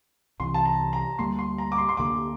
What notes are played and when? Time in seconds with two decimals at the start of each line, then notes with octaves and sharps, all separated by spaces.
0.40 C2 C3 E3 C6
0.54 A5
0.65 A#5
0.93 A#5
1.19 D2 D3 G3 A#3 C6
1.39 C6
1.58 A#5
1.72 D6
1.78 C6
1.89 C6
1.97 D2 D3 G3 A#3 D6